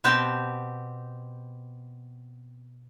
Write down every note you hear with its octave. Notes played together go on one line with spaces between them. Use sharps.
B2 B3 C4 G4 A5